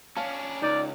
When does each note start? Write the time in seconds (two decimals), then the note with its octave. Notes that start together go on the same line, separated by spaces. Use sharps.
0.17 C#4 D4 F5 A5
0.62 C#2 D#4 D5